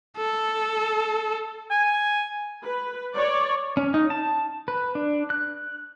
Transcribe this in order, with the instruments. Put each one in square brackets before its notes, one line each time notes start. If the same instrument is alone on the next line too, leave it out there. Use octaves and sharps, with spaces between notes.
[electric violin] A4
[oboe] G#5
[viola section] B4
C#5 D5
[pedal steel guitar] C#4
D#4
A5
B4
D4
F#6